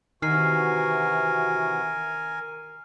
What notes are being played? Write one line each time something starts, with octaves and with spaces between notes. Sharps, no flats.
C3 D#3 E3 F#4 A#4 G#5 F6 C7